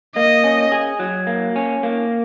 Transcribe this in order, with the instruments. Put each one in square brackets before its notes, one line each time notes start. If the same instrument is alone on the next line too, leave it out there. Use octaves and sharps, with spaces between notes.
[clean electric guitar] A#3 [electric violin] D#5
[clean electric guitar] C#4
G#4
F#3
A#3
C#4
A#3